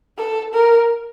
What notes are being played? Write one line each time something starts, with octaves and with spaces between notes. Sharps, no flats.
A4
A#4